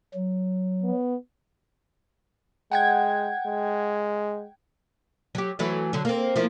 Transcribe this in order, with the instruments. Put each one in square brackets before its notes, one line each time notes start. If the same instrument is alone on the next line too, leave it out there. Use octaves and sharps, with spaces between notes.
[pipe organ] F#3
[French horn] B3
[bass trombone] G#3 [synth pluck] F#5 G5 G#6
[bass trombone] G#3
[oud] F#3 G4
E3 F#3 A3
D3 F#3
A#3 C4
F3 A#3 E4